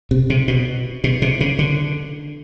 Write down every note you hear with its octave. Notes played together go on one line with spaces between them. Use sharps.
C3
C3
B2
B2
C3
C#3
D3